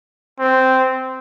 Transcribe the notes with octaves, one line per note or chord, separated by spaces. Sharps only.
C4